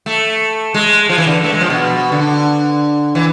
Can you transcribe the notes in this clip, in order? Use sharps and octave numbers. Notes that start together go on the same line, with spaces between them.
A3
G#3
F3
E3
D3
A3
G#3
F3
B2
D3
E3